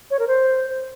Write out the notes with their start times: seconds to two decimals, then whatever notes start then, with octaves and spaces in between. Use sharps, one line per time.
0.11 C#5
0.19 A#4
0.28 C5